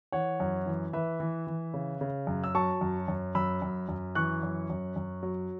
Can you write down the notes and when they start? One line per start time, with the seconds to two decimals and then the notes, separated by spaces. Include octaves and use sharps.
0.12 E3 C#5 F#5
0.40 F#2
0.66 E3
0.93 E3 B4 E5
1.20 E3
1.47 E3
1.74 C#3
2.01 C#3
2.27 F#2
2.44 E6
2.55 F#3 A5 C#6
2.81 F#2
3.08 F#2
3.35 F#2 B5 E6
3.62 F#2
3.89 F#2
4.15 E3 C#6 F#6
4.43 F#2
4.70 F#2
4.96 F#2
5.23 F#3